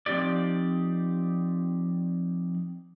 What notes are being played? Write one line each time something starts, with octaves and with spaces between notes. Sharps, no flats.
F3 C4 D#4 G4 D5